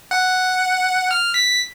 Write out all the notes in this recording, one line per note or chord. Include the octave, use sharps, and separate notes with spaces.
F#5
F6
B6